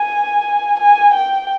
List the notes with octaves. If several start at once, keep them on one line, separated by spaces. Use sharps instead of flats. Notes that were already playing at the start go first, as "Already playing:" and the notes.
Already playing: G#5
G#5
G5